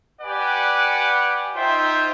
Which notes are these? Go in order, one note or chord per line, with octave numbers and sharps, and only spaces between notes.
G4 B4 D5 F#5 G#5
D#4 F4 C5 E5 G5